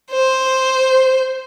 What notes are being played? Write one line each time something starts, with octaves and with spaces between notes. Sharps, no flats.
C5